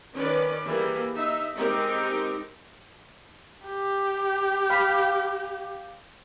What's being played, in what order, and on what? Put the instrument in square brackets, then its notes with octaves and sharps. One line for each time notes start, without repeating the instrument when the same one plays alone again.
[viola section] D#3 C#4 B4 D5
E3 G3 A#3 G#4
D#4 E5
G#3 C4 D#4 G4 A#4
[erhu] G4
[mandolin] F5 B5